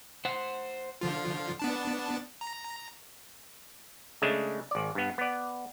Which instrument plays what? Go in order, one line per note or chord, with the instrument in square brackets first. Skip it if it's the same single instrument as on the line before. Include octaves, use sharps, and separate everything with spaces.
[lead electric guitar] C5 F#5
[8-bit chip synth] D3 F3 F4
B3 D4 A5
A#5
[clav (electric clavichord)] C#3 G#3 A3 D4
G#1 D5
G2 B3
B3 D5